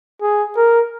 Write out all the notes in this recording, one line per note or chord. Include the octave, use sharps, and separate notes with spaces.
G#4
A#4